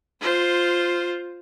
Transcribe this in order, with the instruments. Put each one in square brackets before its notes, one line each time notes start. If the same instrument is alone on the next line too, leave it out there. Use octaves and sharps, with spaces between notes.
[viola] F4 C5